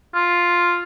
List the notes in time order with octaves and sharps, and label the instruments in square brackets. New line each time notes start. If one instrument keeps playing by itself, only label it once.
[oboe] F4